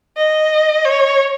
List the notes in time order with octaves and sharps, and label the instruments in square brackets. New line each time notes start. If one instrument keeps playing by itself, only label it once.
[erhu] D#5
C#5